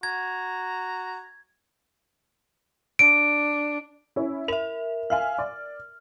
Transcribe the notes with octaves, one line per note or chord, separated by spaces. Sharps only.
F#4 A#5 G#6
D4 D7
C#4 E4
A#4 E5 F7
E5 F5 G#5 F6
D5